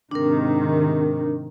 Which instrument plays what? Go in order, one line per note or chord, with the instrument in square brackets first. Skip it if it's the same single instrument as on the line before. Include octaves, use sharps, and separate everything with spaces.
[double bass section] G#2 C3 D#3 [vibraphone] D4 A#4